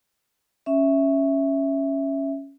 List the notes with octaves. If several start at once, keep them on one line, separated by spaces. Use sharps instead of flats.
C#4 E5